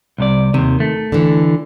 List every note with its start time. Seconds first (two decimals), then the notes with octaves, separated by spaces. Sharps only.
0.18 C2 C3 D5
0.54 D#2 C3 D#3
0.80 A3
1.12 D3 E3